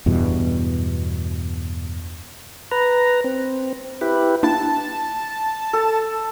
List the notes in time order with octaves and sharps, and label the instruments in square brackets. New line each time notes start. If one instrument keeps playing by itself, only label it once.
[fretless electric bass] E2 G2 B2
[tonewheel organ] B4 A#5
C4
E4 G4 B4
[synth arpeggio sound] A#3 D4 E4 [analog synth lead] A5
[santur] A4